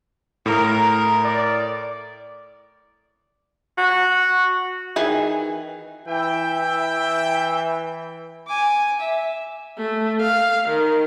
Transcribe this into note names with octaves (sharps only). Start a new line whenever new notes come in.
A2 A#4
D5
F#4
D#3 E3 G#4
E3 E4 E5 G5
G#5 D6
E5
A3
F5
D#3